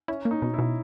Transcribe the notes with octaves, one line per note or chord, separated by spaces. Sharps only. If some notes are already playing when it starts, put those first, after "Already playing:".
C#4 E4
A#3
D#4
B2
B2 E4